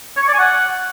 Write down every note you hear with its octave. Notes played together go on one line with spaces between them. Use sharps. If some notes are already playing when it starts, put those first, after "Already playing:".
C#5
C#6
D5
G#5
F#5